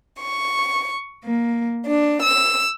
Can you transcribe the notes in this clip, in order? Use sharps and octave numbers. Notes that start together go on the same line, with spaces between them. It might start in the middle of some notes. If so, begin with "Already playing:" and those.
C#6
A#3
D4
E6